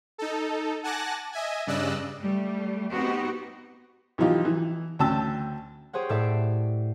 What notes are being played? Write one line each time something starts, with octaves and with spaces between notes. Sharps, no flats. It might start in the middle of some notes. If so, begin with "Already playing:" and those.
D#4 A4
F#5 G#5 A5 D6 F#6 A#6
D#5 E5 G#5
G2 C#3 D5 D#5 E6 F#6
G3 A3
B3 C4 D#4 F#4 G4
B1 E3 F3 D#4 F4 G4
E3
D2 C#4 G5 A5 E6
G4 G#4 C5 C#5 F#5
A2 A3 D5 E5 C7